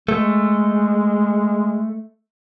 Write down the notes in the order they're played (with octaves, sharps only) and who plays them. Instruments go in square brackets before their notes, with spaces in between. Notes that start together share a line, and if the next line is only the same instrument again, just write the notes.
[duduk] G#3 [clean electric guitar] A3